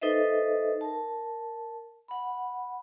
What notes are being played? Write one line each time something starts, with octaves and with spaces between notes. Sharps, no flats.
D#4 A4 B4 C5 D#5 E5
A#4 A5
F#5 B5